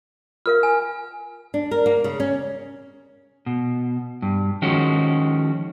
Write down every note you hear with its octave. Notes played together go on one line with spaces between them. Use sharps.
F4 A#4 F5 F6
G#5
D4
A#4
A#3
C#3
C#4
B2
G2
D#3 F3 G#3 C#4 F#4